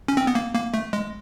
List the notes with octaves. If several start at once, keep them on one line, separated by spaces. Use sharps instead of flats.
C#4
C4
B3
A#3
A#3
A3
G#3